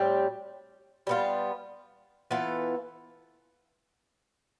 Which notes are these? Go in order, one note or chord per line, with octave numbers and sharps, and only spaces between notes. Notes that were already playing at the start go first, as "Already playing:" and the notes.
Already playing: A2 G3 C4 G4
G3 B3 F4
E3 B3 F4 A4